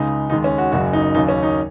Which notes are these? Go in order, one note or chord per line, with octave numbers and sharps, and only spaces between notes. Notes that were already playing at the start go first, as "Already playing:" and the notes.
Already playing: C#2 C#3 G#3 D#4
D#2 D#3 G#3 D#4
C#4
F#4
F#1 F#2 C#3 F#3 F#4
D#4
D#2 C#3 F#3 D#4
C#4
D#4